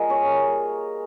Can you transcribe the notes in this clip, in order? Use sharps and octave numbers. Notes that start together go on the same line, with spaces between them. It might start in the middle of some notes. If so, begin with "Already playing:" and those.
Already playing: G3 A#3 F4 G#4 A#4 D#5
C#5